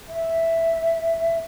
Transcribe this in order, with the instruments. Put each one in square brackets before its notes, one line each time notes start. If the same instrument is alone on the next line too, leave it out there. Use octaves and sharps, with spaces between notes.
[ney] E5